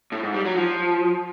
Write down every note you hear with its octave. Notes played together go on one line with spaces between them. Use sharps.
A2
G#2
G3
F#3
F3